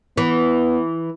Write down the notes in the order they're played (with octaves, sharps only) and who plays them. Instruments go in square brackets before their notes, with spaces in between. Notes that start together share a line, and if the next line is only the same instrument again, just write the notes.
[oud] E3 [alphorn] B3